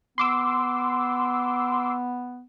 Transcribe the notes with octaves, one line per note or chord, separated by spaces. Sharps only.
B3 C6 D6 E6